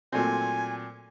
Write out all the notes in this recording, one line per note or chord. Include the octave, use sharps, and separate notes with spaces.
A#2 F#3 A3 C4 G#5